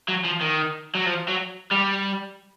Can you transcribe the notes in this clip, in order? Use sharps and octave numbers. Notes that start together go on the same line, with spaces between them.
F#3
F3
D#3
F#3
F3
F#3
G3